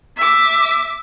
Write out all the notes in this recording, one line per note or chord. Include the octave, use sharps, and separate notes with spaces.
E5 D6